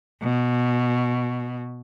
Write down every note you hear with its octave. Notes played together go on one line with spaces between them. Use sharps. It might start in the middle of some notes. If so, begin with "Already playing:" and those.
B2